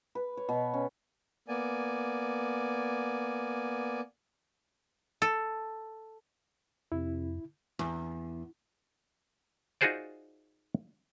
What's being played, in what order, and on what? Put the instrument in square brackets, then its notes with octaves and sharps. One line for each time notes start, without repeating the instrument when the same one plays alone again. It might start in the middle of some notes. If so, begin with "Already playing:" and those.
[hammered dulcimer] B4
C#5
B2
C#4
[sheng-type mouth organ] A#3 B3 D5 G#5
[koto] A4
[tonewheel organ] F2 [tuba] C3 [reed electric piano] E4
[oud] E2
[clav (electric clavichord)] D#4 F4 F#4 G#4 C5 D5